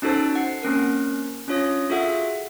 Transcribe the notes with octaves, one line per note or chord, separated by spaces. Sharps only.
C#4 D#4 F#4 A4 C5 A5
F#5 C7
A#3 C4 C#4 A#4
C#4 D4 F4 C#5 D#6 A#6
F4 F#4 G#4 A4 E5 F#5